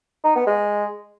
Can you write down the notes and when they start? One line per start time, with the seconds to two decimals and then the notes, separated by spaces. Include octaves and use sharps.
0.24 D#4
0.36 B3
0.47 G#3